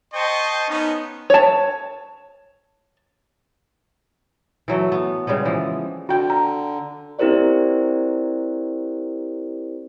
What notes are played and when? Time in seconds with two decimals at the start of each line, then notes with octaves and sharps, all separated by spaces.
0.14 C5 D#5 G5 A5 C6 C#6
0.69 B3 C#4 D#4
1.30 C#5 A5
4.68 E3 F#3 A3
4.92 B3
5.27 C#3 G3 G#3 B3
5.45 E3 F3
6.09 D3 F#4 G5
6.30 A#5
7.19 C4 E4 G4 A#4 C5 D5